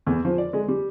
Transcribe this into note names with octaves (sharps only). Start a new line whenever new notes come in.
E2
F3
D5
G#3
G3